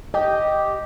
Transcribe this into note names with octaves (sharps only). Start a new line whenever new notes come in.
G4 D#5